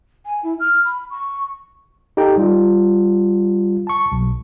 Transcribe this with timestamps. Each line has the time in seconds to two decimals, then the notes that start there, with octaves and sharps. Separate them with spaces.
0.25 G#5
0.43 E4
0.59 F6
0.84 B5
1.10 C#6
2.17 D#4 G4 A4 G5 A#5
2.38 G3 F4
3.87 A5 C#6
4.12 B1